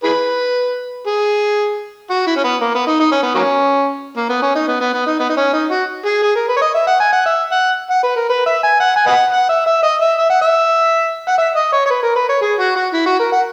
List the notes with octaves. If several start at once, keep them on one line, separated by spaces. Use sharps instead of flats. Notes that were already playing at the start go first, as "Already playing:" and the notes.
E4 G#4 B4
G#4
F#4
E4
C#4
B3
A#3
B3
D#4
D#4
C#4
B3
F#3 A#3 C#4
A#3
B3
C#4
D#4
B3
B3
B3
D#4
B3
D#4
C#4
D#4
F#4
G#4
G#4
A#4
B4
C#5
D#5
E5
F#5
G#5
F#5
E5
F#5
F#5
B4
A#4
B4
E5
G#5
F#5
G#5
B4 D#5 F#5
F#5
E5
E5
D#5
E5
E5
F#5
E5
F#5
E5
D#5
C#5
C#5
B4
A#4
B4
C#5
G#4
F#4
F#4
E4
F#4
A#4
F#5